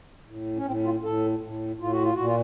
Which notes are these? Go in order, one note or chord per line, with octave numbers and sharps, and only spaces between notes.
A2
C#4
A2 C4
F4
A2 A4
A2
A2 F4
F#4
F4
A#2 F#4
F4